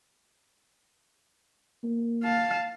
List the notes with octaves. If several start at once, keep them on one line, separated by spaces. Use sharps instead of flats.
A#3
F5 A5